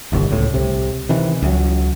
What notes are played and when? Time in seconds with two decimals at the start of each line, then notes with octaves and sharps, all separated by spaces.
0.12 D1 G1 C2 D3
0.31 C#2 A2
0.54 C2 C3
1.09 C3 D#3 E3
1.42 C#2 F#3